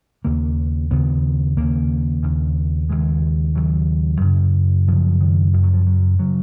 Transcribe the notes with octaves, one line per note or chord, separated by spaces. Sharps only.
D#2 C#3 A#3
D#2 C#3 B3
D#2 C#3 A#3
D#2 C#3
D#2 C#3 G#3
D#2 C#3 F#3
F#2 C#3
F#2 C#3 F3
D#3
F#2 C#3 F3
F#3
F3
F#3
C#3 F#3